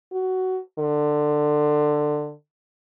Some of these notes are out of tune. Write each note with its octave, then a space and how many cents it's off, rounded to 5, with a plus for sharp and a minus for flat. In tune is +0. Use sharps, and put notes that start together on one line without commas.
F#4 +15
D3 +20